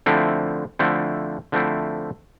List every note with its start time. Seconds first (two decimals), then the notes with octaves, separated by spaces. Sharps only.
0.06 D3 F3 A3 C4 E4
0.79 D3 F3 A3 C4 E4
1.52 D3 F3 A3 C4 E4